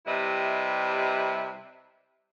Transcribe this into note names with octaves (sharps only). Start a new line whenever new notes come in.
C3 G3 E4 B4 D#5 E5